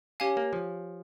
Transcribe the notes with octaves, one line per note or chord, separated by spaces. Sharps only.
C#4 G4 C#5 F5 G#5
A#3
F3